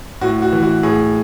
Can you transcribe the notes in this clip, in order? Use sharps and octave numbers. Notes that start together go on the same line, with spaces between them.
A2 F#4
F#4
E3
F#4
A2 G#4